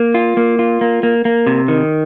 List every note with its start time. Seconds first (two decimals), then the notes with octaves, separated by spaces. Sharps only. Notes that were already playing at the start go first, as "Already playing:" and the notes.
Already playing: A#3
0.14 F4
0.37 A#3
0.59 F4
0.81 A#3
1.03 A#3
1.25 A#3
1.47 C3
1.68 D#3